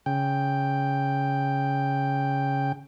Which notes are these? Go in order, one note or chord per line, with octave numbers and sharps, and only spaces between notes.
C#3 G5